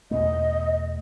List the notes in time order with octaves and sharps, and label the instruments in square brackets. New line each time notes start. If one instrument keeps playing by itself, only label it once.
[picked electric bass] E2 B2 A3 [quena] D#5